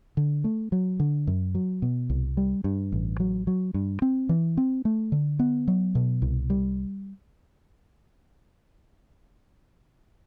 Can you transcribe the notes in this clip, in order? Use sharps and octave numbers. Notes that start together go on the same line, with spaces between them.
D3
A3
F#3
D3
F#2
F#3
B2
C2
G3
G2
A1
F#3
F#3
G2
C4
E3
C4
A3
D3
B3
F#3
B2
C2
G3